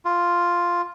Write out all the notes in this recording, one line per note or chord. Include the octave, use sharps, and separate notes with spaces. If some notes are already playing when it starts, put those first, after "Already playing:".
F4